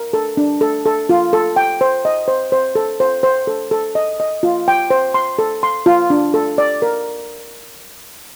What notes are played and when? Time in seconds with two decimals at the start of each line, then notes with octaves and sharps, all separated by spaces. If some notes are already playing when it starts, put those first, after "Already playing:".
Already playing: A#4
0.13 A4
0.37 D4
0.61 A4
0.85 A4
1.09 F4
1.33 A4
1.56 G5
1.81 C5
2.05 D#5
2.28 C5
2.52 C5
2.75 A4
3.00 C5
3.23 C5
3.47 A4
3.71 A4
3.95 D#5
4.20 D#5
4.43 F4
4.68 G5
4.90 C5
5.14 C6
5.39 A4
5.63 C6
5.86 F4
6.10 D4
6.34 A4
6.58 D5
6.82 A#4